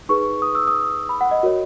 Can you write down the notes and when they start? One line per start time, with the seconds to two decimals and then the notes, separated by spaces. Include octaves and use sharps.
0.09 D#4 G#4 B4 C#6
0.42 D#6
0.55 E6
0.67 D#6
1.09 B5
1.21 F#5
1.31 D#5
1.43 F#4 A#4 C#5